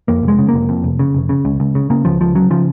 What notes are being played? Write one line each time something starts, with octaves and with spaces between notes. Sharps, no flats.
F2 A#3
F1
G#3
C#3
A#3
F1
F2
F1
C#3
F1
C#3
C#2
C#2
C#3
C#3 A#3
C#2 F3
C#2 F3
C#3 F#3
C#3 F3